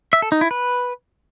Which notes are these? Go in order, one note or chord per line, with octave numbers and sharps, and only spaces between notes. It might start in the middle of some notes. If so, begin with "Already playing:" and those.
E5
A4
D#4
E4
B4